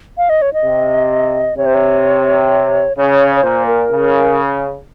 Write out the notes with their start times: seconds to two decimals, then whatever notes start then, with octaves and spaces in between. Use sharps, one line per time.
0.18 F5
0.29 D#5
0.42 C#5
0.53 D#5
0.64 C3
1.57 C3 C#5
1.66 C5
1.74 C#5
2.97 C#3 C#5
3.36 C#5
3.43 A#2 C5
3.66 A#4
3.90 C#3